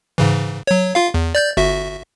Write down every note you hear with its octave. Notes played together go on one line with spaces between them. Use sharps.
G#2 C#3 E3
F#3 C#5
F4 F5
E2
D5 G6 A6
G1 F#4 E5